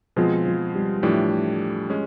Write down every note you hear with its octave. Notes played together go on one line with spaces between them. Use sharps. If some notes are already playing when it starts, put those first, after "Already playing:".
B2 F3 G#3 C4 F4 G#4
F3
G3
A2 E3 F3 A3 D4 G4
G#3 C#4